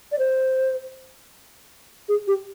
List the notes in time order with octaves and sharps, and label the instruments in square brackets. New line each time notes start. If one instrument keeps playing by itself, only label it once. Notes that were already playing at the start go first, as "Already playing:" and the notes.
[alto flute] D5
C5
G#4
G4